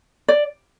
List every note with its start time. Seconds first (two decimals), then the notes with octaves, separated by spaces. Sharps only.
0.28 D5